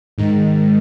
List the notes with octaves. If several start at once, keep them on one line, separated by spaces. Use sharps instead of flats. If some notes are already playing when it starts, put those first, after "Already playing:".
G#2 D#3